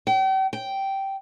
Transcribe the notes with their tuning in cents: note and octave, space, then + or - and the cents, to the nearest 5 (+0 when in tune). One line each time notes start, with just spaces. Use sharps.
G5 -40
G5 -10